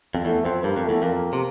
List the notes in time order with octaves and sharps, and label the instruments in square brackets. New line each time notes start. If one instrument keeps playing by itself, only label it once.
[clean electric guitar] F2
[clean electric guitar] E2 [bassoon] A3
[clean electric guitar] F2 [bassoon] C4
[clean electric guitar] G2 [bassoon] A#3
[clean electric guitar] F2
[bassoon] A3
[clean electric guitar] E2
[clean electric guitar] F2 [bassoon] A#3
[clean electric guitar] C3